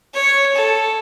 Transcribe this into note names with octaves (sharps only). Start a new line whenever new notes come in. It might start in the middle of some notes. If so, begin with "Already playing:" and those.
C#5
A4